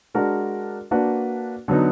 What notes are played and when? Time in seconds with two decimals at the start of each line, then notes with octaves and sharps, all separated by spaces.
0.14 G#3 D4 F#4 A#4
0.91 A#3 D4 F#4 B4
1.68 D3 F#3 B3 D#4